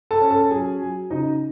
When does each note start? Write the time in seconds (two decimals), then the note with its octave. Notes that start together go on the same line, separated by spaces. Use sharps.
0.11 A4 A5
0.21 C#4
0.31 A4 A5
0.50 F#3 G#4 G#5
0.81 F#3
1.10 C#3 D#4 D#5